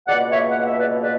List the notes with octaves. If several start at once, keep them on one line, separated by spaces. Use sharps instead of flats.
C#2 B2 A#3 D5 F#5
C#5 E5
F#5
E5
B4 D5
B4 D5